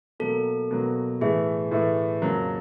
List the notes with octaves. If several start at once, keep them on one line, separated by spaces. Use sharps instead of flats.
B2 F#3 A#3 A4
B2 F#3 A#3
A2 E3 A3 G#4
A2 E3 A3
F2 C#3 F#3 A#3